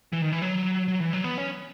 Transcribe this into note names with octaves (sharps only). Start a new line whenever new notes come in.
E3
D#3
E3
F#3
F#3
E3
F#3
B3
C#4